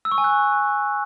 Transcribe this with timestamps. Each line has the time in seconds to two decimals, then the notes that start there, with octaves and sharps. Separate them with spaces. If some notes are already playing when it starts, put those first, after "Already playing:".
0.05 E6
0.12 C#6
0.18 G#5
0.24 F#6